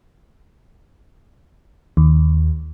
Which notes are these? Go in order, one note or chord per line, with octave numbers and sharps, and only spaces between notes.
D#2